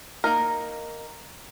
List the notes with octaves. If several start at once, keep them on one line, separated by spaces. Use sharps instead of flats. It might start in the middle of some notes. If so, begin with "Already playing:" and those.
A#3 D#4 A#4